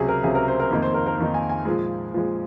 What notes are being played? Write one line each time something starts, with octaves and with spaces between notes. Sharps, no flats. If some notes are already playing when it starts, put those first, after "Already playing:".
Already playing: C#2 C3 F#3 G#4
A#4
C#2 C3 F#3 G#4
A#4
C5
A#4
F2 D#3 A#3 D#4 A#4
C5
A#4
A#4
F2 D#3 A#3 D#4
G#5
G#5
A#2 F3 G#3
A#2 F3 G#3